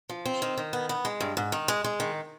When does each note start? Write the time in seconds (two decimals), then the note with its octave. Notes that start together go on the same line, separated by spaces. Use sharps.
0.09 F3
0.25 C4
0.42 D#3
0.58 D#3
0.73 B3
0.89 B3
1.05 G#3
1.21 G2
1.37 G#2
1.52 D#3
1.68 G#3
1.84 G#3
2.00 D#3